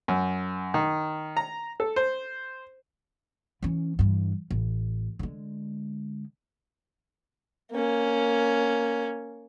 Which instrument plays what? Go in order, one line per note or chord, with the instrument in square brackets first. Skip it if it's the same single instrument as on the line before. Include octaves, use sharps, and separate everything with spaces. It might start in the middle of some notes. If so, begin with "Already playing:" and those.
[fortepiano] F#2
D#3
A#5
A4
C5
[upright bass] E3 C#4
G2 E3
A1
D3 G#3
[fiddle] A#3 C#4